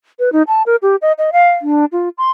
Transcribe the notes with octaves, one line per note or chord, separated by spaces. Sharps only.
B4
D#4
A5
A#4
G4
D#5
D#5
F5
D4
F4
C6